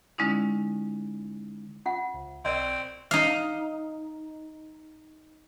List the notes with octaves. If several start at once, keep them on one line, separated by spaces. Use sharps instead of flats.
D3 G#3 C#4 D#4 E4
F4 F#5
C#2
B1 C4 A#4 D5 D#5
D#4 F5